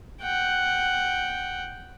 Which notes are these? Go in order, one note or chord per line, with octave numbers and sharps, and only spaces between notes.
F#5 G5